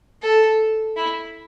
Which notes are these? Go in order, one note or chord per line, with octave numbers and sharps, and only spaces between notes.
A4
E4